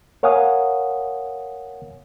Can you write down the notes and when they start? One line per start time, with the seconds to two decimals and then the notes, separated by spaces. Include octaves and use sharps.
0.23 A#4 C#5 F5 F#5 G#5 D#6